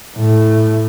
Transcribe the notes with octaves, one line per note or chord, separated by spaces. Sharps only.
A2